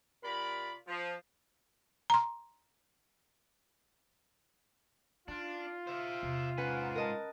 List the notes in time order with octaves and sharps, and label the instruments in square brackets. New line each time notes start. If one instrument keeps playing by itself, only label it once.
[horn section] C3 F4 A#4 D5 B5
F3
[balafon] A#5 C6
[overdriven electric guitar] D4 [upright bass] D#4 [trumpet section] F4
[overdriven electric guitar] C5 E5
[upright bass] E2 C3
[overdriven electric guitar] G#2 G#5 [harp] C#4 B4 F#5
[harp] A#4 D#5 A5